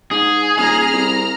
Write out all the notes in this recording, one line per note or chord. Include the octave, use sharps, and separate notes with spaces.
G#2 G#4
D#1 A#5 F6
C2